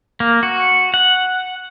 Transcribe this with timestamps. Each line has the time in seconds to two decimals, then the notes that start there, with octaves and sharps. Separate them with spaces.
0.20 A#3
0.43 F#4
0.94 F#5